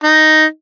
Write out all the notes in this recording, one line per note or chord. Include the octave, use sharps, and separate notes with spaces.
D#4